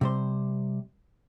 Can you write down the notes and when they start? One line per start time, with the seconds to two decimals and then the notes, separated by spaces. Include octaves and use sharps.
0.01 C3 G3 C5